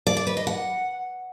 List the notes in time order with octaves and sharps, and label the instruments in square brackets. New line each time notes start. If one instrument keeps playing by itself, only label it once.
[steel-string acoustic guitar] D5
D5
B4
D#5
F#5